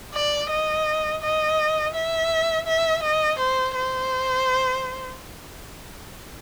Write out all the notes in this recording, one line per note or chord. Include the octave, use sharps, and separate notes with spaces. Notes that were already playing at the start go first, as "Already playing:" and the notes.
D5
D#5
D#5
E5
E5
D#5
C5
C5